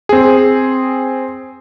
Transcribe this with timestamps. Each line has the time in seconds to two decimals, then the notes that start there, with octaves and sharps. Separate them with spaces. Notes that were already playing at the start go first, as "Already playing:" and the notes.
0.09 C4 G#4